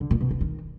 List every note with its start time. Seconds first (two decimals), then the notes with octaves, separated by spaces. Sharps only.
0.01 D3
0.11 A#2
0.21 B2
0.31 D3
0.41 D#3